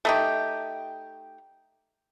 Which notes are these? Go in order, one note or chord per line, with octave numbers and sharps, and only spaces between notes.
A3 D#4 G4